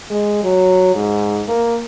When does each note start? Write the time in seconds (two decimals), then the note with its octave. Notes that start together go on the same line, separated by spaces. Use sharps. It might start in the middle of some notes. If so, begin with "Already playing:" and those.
0.10 G#3
0.43 F#3
0.95 G#2
1.48 A#3